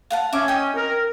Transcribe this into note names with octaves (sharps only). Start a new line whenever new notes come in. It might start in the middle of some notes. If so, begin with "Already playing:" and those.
F5 F#5 A5
C#4 E5 D6
D#5 G5
A#4